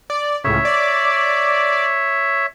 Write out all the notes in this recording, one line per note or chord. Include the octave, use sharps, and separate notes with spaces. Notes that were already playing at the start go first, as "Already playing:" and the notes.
D5
C#2 A2 C#3 C#5 E5
D5